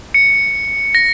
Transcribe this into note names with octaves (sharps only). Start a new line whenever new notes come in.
C#7
A#6